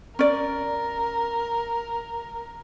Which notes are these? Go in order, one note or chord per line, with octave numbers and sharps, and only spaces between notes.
C#4 A#4 D5